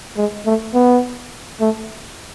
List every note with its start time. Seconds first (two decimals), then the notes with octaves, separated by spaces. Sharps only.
0.17 G#3
0.46 A3
0.74 B3
1.60 A3